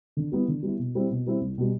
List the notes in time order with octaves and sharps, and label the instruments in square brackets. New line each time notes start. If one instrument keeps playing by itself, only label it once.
[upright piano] D3
G3 B3 E4
D3
G3 B3 E4
B2
G3 C4 E4
B2
G3 C4 E4
C2
B2 G3